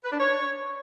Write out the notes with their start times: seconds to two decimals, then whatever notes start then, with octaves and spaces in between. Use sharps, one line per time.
0.04 B4
0.12 D4
0.20 C#5